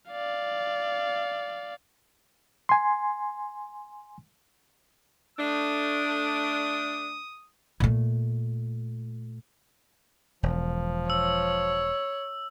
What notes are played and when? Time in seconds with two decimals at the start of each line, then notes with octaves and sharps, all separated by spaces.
0.11 D5 F5
2.69 G#5 C6
5.39 A3 D4 D#6
7.80 A#2 A3
10.43 E1 F3
11.10 C#5 E6